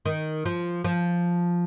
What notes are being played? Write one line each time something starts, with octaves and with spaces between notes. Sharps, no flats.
D#3
F3
F3